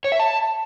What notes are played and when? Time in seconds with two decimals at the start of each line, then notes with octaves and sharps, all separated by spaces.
0.04 C#5
0.12 E5
0.20 A5